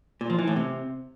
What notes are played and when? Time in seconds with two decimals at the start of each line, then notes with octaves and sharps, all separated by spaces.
0.21 A#2
0.30 F3
0.39 E3
0.47 A2
0.56 C3